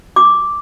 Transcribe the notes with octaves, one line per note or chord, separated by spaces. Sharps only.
D6